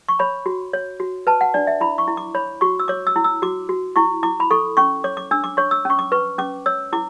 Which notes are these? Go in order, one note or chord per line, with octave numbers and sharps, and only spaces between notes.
C#6
C#5 B5
F#4
C#5
F#4
B4 A5
F#5
D4 D5
E5
E4 B5
C#6
E4
D6
C#5 B5
F#4 C#6
E6
C#5 D6
E6
E4
E6
F#4 D6
F#4
E4 C#6
E4 D6
B5
A4 C#6
C#4 C#6
C#5 D6
D6
D4 E6
D6
C#5 C#6
E6
C#4 C#6
D6
B4 C#6
C#4 D6
C#5 E6
E4 D6